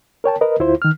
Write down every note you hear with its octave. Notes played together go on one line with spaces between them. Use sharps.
A#4 C#5 G5 A5
A#4 B4 D#5
D2 E4 F4 C5
D#3 F6